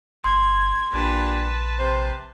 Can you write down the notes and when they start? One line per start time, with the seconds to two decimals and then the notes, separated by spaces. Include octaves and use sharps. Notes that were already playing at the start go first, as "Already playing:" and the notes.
0.24 G1 C6 G#6
0.93 A#1 A#2 G3 D4 B4 A5
1.78 C3 C5